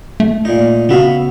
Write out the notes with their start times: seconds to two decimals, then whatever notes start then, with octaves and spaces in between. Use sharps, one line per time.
0.20 A3
0.45 A#2 D#4
0.89 C#3 B3 F#4 E5 F5